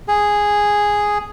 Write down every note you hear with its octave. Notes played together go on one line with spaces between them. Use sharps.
G#4